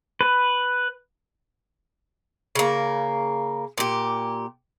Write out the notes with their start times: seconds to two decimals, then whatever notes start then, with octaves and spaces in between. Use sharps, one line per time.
0.21 B4
2.55 C#3 A#3
3.78 A#2 G4